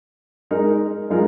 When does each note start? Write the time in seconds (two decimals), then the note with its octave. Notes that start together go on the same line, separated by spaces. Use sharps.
0.51 G#3 D#4 A#4
1.10 F3 G#3 D#4 A#4